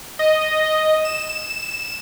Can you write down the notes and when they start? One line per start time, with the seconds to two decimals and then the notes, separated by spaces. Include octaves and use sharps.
0.19 D#5
1.05 E7